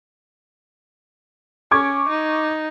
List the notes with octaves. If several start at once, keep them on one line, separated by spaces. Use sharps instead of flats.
C#4 C#6 D6 G#6
D#4